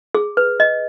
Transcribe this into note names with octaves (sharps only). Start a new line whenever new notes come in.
G#4
B4
D#5